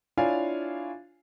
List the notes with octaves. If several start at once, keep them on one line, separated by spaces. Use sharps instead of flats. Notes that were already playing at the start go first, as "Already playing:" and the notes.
D4 E4 F4 C#5 F5 G#5